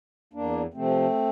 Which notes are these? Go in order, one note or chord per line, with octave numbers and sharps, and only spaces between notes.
E2 A#3 D4
C3 F3 A3 C4